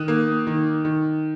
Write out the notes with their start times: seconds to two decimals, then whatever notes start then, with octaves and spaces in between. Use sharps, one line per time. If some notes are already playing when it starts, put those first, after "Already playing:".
Already playing: D#3 D#6 F#6
0.08 A#3
0.47 D#3
0.85 D#3